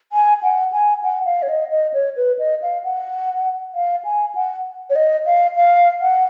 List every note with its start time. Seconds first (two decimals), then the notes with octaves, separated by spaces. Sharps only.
0.12 G#5
0.43 F#5
0.72 G#5
1.03 F#5
1.25 F5
1.42 C#5
1.48 D#5
1.71 D#5
1.94 C#5
2.16 B4
2.39 D#5
2.62 F5
2.84 F#5
3.75 F5
4.04 G#5
4.35 F#5
4.90 C#5
4.96 D#5
5.26 F5
5.56 F5
6.01 F#5